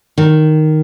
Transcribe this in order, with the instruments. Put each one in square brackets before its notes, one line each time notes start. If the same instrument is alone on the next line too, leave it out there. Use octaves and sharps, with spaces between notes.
[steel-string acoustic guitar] D#3